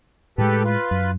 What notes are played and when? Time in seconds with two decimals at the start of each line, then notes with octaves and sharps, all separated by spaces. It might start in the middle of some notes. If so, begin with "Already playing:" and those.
0.38 A2 G#3 G4 A4 B4
0.64 F4 B4
0.91 F#2